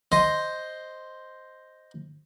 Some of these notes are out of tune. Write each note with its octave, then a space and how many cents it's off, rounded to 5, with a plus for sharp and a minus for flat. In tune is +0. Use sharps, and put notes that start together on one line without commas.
C5 +0 D#5 +0